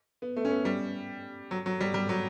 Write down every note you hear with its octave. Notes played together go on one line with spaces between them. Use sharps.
B3
A3
C#4
B3
G3
F#3
F#3
G3
G3
F#3